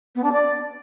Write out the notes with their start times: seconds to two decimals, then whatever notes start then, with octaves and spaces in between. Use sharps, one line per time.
0.15 B3
0.23 D4
0.32 D5